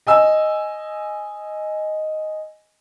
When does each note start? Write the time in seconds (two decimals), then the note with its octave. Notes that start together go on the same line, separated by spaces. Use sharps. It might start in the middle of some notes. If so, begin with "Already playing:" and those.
0.07 D#5 G#5 E6